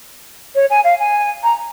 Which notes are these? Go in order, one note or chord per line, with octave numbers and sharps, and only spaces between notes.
C#5
G#5
F5
G#5
A#5